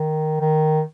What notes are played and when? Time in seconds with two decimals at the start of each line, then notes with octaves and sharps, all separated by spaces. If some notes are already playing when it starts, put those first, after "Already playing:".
Already playing: D#3
0.40 D#3